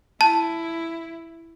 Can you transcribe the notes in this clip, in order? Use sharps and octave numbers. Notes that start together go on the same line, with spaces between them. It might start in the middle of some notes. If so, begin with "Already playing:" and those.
E4 A5